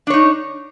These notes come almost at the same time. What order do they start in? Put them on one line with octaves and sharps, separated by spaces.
D4 C#5 D#4